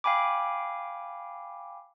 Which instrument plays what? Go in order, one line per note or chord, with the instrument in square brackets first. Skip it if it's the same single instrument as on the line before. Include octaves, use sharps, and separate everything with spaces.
[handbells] F5 G5 G#5 B5 D6